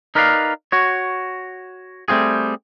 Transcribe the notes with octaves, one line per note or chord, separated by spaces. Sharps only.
D#4 A#4 B4 D5 D#5 F5
F#4 C#5
G3 A3 C4 F4 G#4